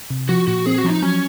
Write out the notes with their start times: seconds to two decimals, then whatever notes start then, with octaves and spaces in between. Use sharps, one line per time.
0.10 C3
0.29 F3 F#4
0.48 A#2 F#4
0.66 C4 G#4
0.78 F#4
0.84 F3 C#4
0.90 D#4
1.02 F#3 C#4